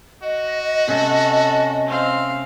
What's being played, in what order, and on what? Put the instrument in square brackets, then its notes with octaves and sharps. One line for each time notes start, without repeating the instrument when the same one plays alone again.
[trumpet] F#4 [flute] D#5
[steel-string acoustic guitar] C3 C#4 [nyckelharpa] A4
[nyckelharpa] C4 F5